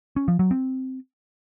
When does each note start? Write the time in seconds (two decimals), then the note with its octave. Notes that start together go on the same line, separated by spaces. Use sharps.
0.16 C#4
0.28 F3
0.39 F#3
0.51 C4